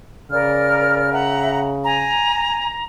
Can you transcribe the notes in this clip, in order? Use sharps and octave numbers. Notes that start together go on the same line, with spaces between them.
C#3 A#4 D5 F6
E5 F#5 A#5
G#5 A#5